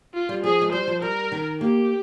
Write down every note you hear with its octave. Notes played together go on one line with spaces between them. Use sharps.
F4
G3
F3 G#4
G#3
G3 C5
F3
G3 A#4
D#3
A#3 G4